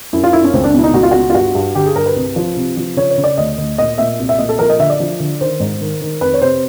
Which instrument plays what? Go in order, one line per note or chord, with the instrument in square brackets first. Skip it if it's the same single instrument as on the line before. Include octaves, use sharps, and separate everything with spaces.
[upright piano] F#2 E4
F4
F#2 E4
C#4
C#2 C4
D4
B2 E4
D#4
C#2 F#4
F4
B2 F#4
F4
G2 F#4
G2
D3 G4
G#4
G2 A#4
B4
C2
F3
C3
F3
C#3 C#5
C#5
C#3
D5
D2 D#5
D2
A#2 D#5
A#2 E5
C2
E5
A#2 D#5
A4
F3 A#4
D#5
D3 E5
D5
F3
D3
D#3 C5
G#2
D#3
D#3
F2 B4
C#5
C3 C5